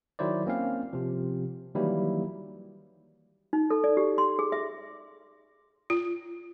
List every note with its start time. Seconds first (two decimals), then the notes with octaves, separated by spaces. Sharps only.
0.19 D#3 F#3 E4 C5 D5
0.46 A#3 C4 C#4 F5
0.93 C3 F3
1.75 D#3 E3 F#3 G3 A#3 E4
3.53 D#4
3.70 A4
3.84 D5
3.97 G4
4.18 C6
4.39 G#4
4.52 E5
5.90 F4